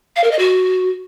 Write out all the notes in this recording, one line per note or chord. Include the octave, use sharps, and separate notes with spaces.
F5
A#4
D#5
F#4